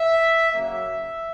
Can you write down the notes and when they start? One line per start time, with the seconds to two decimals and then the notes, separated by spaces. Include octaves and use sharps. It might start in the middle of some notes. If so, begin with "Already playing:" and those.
Already playing: E5
0.52 C#3 F#3 A#3 E5